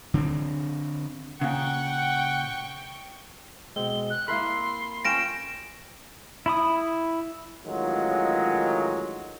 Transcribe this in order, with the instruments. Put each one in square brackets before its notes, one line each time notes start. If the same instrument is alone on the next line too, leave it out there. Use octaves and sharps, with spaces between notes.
[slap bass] D3 C4
[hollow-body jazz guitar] A#2 C#3 [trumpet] F#5 [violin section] G5 C#6
[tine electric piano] B2 G#3 [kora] C4 [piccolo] G7
[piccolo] F#6
[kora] A#3 E4 A#4 [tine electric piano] B5 [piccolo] C6
[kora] C#4 F4 [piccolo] G5 [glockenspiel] A#6 D7 E7
[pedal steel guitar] E4 B5 D#6
[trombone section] A1 D#3 F#3 G#3 F4